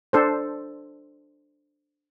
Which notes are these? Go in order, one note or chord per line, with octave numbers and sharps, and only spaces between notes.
D4 A4 C5